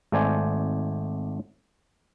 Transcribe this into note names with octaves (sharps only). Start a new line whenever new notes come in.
G#1 A3 C5 D5 G#5